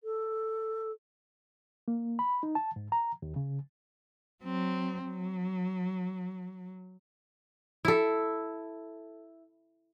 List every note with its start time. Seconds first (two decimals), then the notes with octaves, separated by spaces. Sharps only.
0.03 A4
1.88 A#3
2.19 B5
2.43 D#4
2.55 A5
2.76 G#2
2.92 A#5
3.22 D#2
3.36 C#3
4.44 F#3 C4
5.05 F#3
7.85 E4 A4